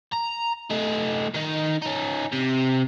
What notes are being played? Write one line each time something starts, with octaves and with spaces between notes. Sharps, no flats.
A#5
A3 D#4
D#3 D#4
C#4 D#4
C3